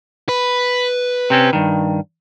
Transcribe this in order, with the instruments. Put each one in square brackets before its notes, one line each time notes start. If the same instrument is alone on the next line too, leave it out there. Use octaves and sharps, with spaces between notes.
[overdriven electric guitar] B4
[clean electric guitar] C3 C4 C#4
G2 D#3